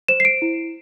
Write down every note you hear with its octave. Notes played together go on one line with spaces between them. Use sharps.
C5 E7
C7
D7
E4